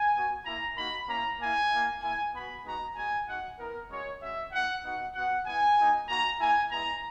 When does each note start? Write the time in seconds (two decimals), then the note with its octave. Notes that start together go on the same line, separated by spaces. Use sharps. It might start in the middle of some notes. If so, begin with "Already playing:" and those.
Already playing: G#5
0.14 B3 F#4
0.46 A#3 E4 A#5
0.77 A#3 D#4 F#4 B5
1.08 A#3 C#4 E4 A#5
1.39 A#3 E4 G#5
1.70 A#3 E4
2.02 A#3 E4 G#5
2.33 B3 F#4 B5
2.65 G#3 B3 D#4 F#4 A#5
2.96 G#3 B3 F#4 G#5
3.27 G#3 D#4 F#4 F#5
3.58 B3 E4 A#4
3.90 G#3 C#4 F#4 C#5
4.21 G#3 C#4 F#4 E5
4.52 A#3 E4 F#5
4.83 B3 D#4 F#4 F#5
5.15 B3 F#4 F#5
5.46 B3 E4 G#5
5.78 A#3 D#4 F#4
6.08 A#3 D#4 F#4 A#5
6.40 A#3 E4 G#5
6.71 G#3 B3 E4 A#5